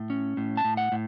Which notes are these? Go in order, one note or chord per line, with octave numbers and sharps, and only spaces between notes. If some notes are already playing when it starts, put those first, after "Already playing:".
Already playing: A2
C#4
A2
A5
A2
F#5
A2